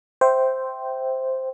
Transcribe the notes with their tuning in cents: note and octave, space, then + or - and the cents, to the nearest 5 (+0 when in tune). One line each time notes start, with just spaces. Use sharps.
C5 +0 E5 +0 G5 -10